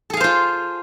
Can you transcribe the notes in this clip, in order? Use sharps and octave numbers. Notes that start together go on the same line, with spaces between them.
F4 G#4 A4 C5 F5